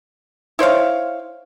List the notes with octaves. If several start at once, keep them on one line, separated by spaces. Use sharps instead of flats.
E4 C5 C#5 F5